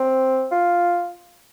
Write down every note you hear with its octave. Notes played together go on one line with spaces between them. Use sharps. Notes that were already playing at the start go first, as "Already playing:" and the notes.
Already playing: C4
F4